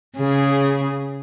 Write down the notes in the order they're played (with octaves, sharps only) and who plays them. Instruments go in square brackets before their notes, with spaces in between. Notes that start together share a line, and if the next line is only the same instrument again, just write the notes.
[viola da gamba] C#3 G#4